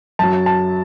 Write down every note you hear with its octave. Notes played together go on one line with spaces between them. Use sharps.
F#2 F#3 A5
A5